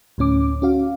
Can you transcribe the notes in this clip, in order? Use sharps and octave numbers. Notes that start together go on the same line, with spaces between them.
D2 A2 C#4 D6
C#4 F#4 F5